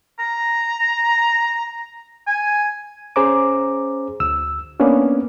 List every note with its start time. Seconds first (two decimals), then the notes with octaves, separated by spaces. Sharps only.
0.20 A#5
2.27 G#5
3.16 C#4 G#4 C5 A#5 D6
4.20 D2 E6
4.80 A#3 B3 C#4 D4